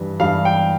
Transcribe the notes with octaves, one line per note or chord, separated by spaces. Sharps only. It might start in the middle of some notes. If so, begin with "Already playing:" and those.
Already playing: G2 E3 G3
G2 E3 G3 F5
G5